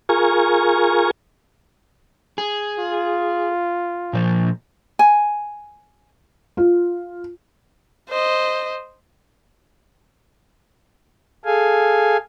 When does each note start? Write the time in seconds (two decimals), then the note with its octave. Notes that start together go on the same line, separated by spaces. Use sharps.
0.09 F4 G#4 A#4 G#5 A#5 C#6
2.38 G#4
2.79 F4
4.13 A#2 F3
4.99 G#5
6.57 F4
8.09 C5 D#5
11.45 G#4 A4 F5 G#5